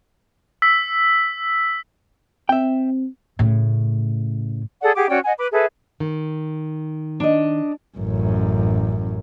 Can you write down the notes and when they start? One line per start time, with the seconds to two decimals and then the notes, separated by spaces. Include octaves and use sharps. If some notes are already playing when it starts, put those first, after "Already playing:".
0.62 E6 B6
2.49 C4 E5 G5
3.39 A2 C#3
4.82 G#4 A4 D5 F#5
4.95 G4 G#4 F#5 D6
5.10 C#4 F#4 D5 G5
5.25 D#5 F#5 G#5
5.38 B4 B5 D6
5.52 G#4 A4 B4 E5
6.00 D#3
7.20 D4 D#5
7.98 A1 F#2